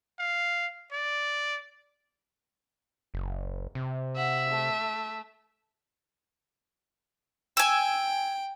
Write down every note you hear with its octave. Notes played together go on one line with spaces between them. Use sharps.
F5
D5
F#1
C3
E5 F#5
A3
G5 G#5 E6